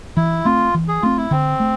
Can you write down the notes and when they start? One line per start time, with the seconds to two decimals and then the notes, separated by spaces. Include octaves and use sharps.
0.17 E3 E4
0.45 A3 C4 F4
0.74 E3
0.88 G#4
1.02 A3 C4 F4
1.17 E4
1.31 D3 C4
1.60 A3